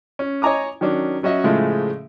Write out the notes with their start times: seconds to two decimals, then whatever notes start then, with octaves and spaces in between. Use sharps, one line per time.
0.19 C#4
0.42 C#5 D#5 G#5 A#5 D6 D#6
0.81 D#3 F#3 C#4 D4
1.23 F#3 C#4 F#4 D#5 E5
1.44 A2 C#3 F3 G#3 A3